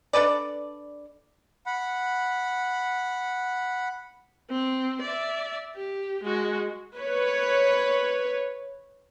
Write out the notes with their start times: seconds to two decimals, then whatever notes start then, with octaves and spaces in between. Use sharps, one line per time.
0.13 D4 A4 B4 D5
1.66 F#5 B5
4.50 C4
5.02 D5 E5
5.75 G4
6.23 G#3 F#4
6.96 B4 C#5